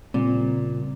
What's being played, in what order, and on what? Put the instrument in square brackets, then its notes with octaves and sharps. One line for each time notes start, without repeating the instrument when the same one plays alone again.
[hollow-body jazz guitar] A#2 [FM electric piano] C#3 G3 C4